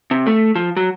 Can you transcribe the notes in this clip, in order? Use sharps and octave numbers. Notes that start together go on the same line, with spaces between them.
C3
A3
F3
F#3